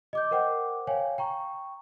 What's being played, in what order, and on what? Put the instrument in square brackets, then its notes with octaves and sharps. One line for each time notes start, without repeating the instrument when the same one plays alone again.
[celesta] D#5 D6 G6
A#4 C5 F#5 G5 D6
C#5 F5 G5 G#5
G5 A#5 C#6